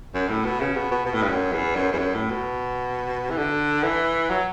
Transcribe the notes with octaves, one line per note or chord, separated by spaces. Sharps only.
F#2
A2
B2
C#3
B2
B2
B2
A2
G2
F#2
E2
F#2
E2
F#2
A2
B2
E3
D3
E3
F#3